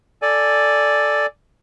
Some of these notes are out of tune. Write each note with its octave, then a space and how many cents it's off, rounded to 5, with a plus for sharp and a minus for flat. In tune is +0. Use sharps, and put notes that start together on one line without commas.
A4 +0 D5 +0 G#5 +0